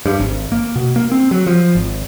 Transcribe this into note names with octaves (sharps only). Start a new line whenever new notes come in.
G2
G#1
A#3
B2
A#3
C4
F#3
F3
G#1